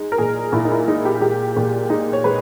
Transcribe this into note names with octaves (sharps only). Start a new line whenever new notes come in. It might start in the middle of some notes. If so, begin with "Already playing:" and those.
Already playing: G#3 D#4
A#4
A#2 G#4
A#2 E4
D#4
E4
G#3 D#4
G4
G#3 G4
A#2
G#3 D#4
C#5
G#3 B4